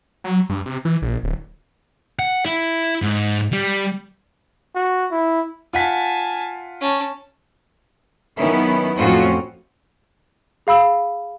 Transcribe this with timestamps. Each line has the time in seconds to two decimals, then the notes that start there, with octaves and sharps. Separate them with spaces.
0.24 F#3
0.49 G2
0.66 C3
0.85 E3
1.02 A#1
1.23 D1
2.19 F#5
2.46 E4
3.02 G#2
3.52 G3
4.75 F#4
5.11 E4
5.73 F4 F#5 G#5 A5 B6
6.81 C#4 A5
8.38 D#3 F#3 B3 C#4 E4
8.99 F2 A2 C4 C#4 F4 F#4
10.67 G#4 F5 B5 E6